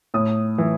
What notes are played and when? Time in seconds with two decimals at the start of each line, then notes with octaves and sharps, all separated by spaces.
0.14 A2 D#6
0.58 E3